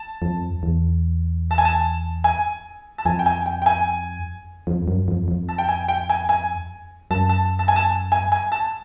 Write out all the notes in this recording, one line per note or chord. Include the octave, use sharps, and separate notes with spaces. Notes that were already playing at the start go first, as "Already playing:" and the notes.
Already playing: A5
F2
E2
A5
G#5
A5
G#5
A5
F2 G#5
G5
G#5
G5
G5
G#5
F2
F#2
F2
F2
A5
G5
G#5
G5
G#5
G#5
F#2 A5
A5
A5
G#5
A5
G#5
G#5
A5